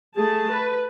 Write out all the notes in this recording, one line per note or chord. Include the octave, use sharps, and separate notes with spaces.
A3 G#4 A5
B4